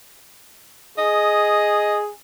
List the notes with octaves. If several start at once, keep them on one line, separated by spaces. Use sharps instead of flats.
G#4 D#5